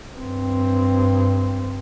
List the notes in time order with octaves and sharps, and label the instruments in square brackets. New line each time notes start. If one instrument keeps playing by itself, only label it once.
[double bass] G2 C4